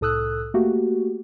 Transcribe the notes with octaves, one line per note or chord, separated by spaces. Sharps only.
C2 A2 A4 D#6 E6 F#6
A3 A#3 F#4 G4